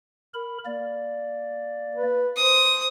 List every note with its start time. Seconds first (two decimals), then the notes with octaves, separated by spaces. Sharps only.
0.34 A#4 B5
0.65 A#3 D5
1.95 B4
2.37 C5 D#6